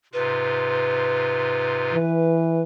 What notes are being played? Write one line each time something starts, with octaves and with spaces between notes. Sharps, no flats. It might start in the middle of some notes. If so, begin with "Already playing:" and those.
G#2 C3 F4 B4
E3